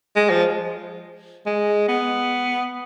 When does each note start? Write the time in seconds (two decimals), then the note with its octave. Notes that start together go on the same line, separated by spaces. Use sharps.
0.16 G#3
0.30 F3
1.46 G#3
1.88 B3